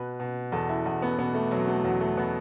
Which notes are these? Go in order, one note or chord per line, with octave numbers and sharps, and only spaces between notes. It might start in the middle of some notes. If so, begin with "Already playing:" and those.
Already playing: B2 B4
B2
E2 A4
E4
E2
B3
B2 B3
A3
B2 F#3
A3
E2 F#3
A3
B2 B3